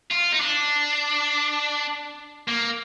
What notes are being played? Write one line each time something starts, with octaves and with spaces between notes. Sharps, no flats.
F4
D#4
D4
A#3